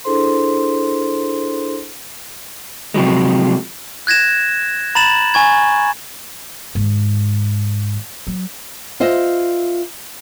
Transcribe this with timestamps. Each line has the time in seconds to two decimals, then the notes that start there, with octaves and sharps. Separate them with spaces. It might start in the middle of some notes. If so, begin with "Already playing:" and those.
0.04 D4 E4 G#4 A4 C5 C6
2.94 C3 F3 F#3 G#3
4.07 F#6 G#6 A#6 E7
4.95 A#5 B5 A6 E7 F#7
5.34 G#5 C#6 G#6
6.75 G#2 D#3
8.27 F#3
9.00 F4 C5 D#5 E5